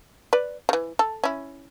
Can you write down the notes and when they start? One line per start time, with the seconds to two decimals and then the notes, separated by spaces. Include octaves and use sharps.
0.33 B4 D5
0.69 C#3 E3
0.99 A4
1.24 C#4 E4